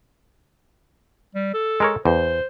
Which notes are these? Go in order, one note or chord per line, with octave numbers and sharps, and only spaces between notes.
G3
A4
G#3 A#4 C#5
E2 C5